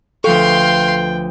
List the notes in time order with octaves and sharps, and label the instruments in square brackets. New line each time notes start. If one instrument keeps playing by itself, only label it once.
[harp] D2 F3 C#6 [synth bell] A4 [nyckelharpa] B4 G5 [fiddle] F5 C6